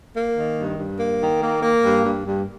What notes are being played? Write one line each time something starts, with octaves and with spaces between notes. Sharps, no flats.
A#3
D#3
G2
G2
A#3
D#3
A#3
A#3
G2
G2
G2